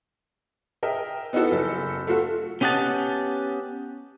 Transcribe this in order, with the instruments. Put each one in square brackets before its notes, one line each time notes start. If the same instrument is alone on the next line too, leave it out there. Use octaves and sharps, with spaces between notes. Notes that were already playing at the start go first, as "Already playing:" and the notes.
[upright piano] G#4 A#4 D#5 E5 G5
B3 D#4 E4 F#4 A4
F#1 A4
A3 F4 F#4 A4
[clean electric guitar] B3 C#4 G4 D#5 F#5 A5